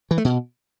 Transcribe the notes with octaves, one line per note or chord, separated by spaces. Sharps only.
E3
A3
B2